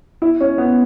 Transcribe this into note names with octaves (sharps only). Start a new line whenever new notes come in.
E4
C#4
B3